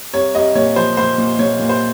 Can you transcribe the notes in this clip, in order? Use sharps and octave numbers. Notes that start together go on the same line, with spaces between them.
C2 C#5
C2 D#5
A#2 C#5
F3 C5
A#2 C5
A#2
A#2 C#5
A#2
C5